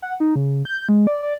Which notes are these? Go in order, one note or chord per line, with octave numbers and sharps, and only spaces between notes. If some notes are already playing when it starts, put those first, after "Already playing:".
F#5
D#4
C#3
G6
G#3
D5
D5